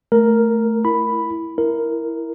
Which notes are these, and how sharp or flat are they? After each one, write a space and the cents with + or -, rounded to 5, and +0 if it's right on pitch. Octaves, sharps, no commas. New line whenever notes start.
A3 +0 A#4 +0
E4 +0 B5 +0
E4 +0 A#4 +0